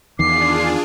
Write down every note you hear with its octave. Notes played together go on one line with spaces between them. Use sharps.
E2 D#3 D4 F4 G#4 D6 C7